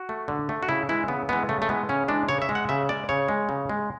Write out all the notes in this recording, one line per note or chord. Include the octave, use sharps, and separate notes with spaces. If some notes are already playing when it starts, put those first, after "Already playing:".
Already playing: F#4
A3
D3
A3
F#4
C#3 E4
E3 G#3 E4
C#3 B3
E3 G#3 B3
C#3 A3
A3
E3 G#3 B3
C#3 C#4
E3 G#3 D4
C#3 C#5
E5
G#3
F#5
C#3 E5
G#3 D5
C#3 C#5
G#3
C#3
G#3